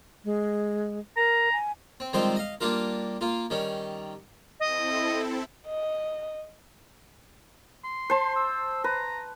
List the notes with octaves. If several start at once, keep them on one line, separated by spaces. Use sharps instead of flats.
G#3
A#4 A#5
G#5
C4
D#3 F3 G3 G#3 C4 C5
D#5 F5
G3 A#3 D4 F4 A#4
A#3 F4
D#3 G3 C#4
C4 E4 A4 D#5
D#5
C6
C5 A5
E6
B4 A#5